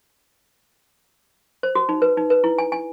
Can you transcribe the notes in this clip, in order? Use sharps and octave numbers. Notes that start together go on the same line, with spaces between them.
C5
F#4
D#4
B4
D#4
B4
E4
G#5
G#5